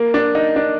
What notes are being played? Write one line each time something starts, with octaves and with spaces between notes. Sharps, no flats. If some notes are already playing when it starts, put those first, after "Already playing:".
Already playing: A#3
D4
D#4
D4